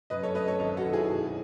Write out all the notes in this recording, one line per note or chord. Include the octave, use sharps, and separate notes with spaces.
F#2 B4 D#5
A4 C#5
A3 B4 D#5
A4 C#5
G#1 A4 C#5
F#4 A4
D#3
E4 G#4
B1